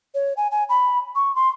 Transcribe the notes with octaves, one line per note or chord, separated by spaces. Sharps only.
C#5
G#5
G#5
B5
C#6
C6